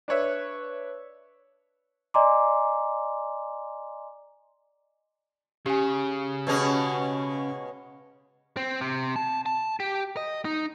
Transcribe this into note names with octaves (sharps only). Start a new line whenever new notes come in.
D4 B4 C#5 E5
D5 D#5 G#5 A#5 C6 D6
C#3 G4 G#5
B2 G#3 C#4
C4
C3
A5
A5
G4
D#5
D#4